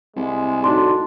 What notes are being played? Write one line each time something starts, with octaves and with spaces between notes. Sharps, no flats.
C2 G#3
A2 D4 D#4 F#4 C6